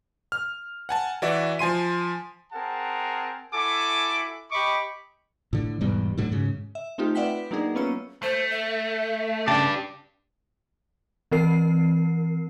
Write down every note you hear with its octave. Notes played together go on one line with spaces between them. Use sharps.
F6
F#5 G#5 A5
E3 F#4 D5 E5
F3 G#5 C6 D#7
C4 G#4 A#4 F#5 A5
E4 F#4 A4 G#5 D6
G4 D#5 B5 C#6 D6
A2 D3
E1 G#2 B2 G3
A2 D3 F#3
G#2 C#3
E5
A3 C4 D#4 F4 G4
B4 D5 E5 F#5 G5 B6
F#3 A#3 D4 D#4 G#4 A#4
A#3 B3 C#4 F4 C#5 E6
A3 C5
E5
C#3 D4 G4 A5
E3 C4 A#4 C7